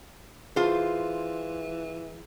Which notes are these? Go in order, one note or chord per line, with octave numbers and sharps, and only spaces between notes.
E3 F4 G#4 C5